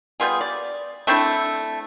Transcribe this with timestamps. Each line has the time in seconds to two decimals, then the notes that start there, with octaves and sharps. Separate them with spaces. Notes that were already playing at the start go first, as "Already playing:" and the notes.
0.20 G3 B3 F4 G#4
0.41 D5
1.07 A3 C4 D4 E4